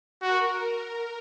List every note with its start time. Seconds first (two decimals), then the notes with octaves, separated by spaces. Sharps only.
0.22 F#4 A#4